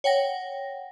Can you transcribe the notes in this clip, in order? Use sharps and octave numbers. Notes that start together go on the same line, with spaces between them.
C#5 F#5 G5 A#6